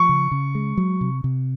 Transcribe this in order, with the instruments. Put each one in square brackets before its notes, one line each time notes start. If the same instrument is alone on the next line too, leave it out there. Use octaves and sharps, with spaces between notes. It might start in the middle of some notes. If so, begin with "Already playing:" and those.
Already playing: [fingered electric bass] F3 [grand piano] C#6
[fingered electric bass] C#3
C#3
G#3
F#3
C3
C3